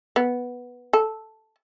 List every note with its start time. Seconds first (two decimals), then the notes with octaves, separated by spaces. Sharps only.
0.16 B3
0.93 A4